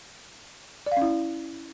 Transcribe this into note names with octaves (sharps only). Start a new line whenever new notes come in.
D5
F5
C#4
E4